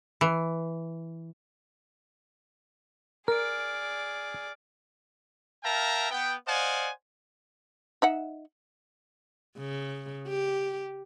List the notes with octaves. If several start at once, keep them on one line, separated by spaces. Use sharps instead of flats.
E3
G#4 A#4 D5 F6 D7
A#4 E5 F5 G5 A5 A#5
B3 G5
C5 D5 D#5 F5 F#5 G#5
D#4 E5 F#5
C#3
G4